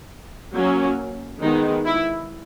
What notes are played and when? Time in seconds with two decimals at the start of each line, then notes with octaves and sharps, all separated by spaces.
0.54 F#3 A#3 C#4
1.42 D#3 G#3 B3 D#4
1.86 E4